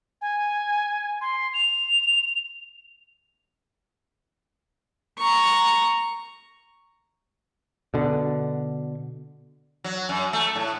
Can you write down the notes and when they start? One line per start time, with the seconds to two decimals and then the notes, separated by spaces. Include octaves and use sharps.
0.21 G#5
1.21 C6
1.54 F7
5.18 A#5 C#6
7.94 B2 D3
9.84 F#3
10.09 F#2
10.33 A3
10.55 A2